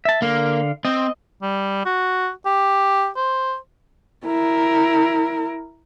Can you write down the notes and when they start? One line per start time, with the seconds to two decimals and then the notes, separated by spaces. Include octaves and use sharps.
0.05 E5 A5
0.22 D3 A#3 F5
0.85 C4 D#5
1.42 G3
1.85 F#4
2.46 G4
3.16 C5
4.26 E4 A#4